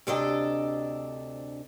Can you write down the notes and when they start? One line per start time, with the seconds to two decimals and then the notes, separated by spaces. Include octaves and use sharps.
0.07 D2 C3 D4 A4 D5 D#5